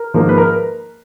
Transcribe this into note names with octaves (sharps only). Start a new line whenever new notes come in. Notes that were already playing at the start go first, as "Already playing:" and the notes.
Already playing: A#4
G#2 F3 A#3
B4
A#4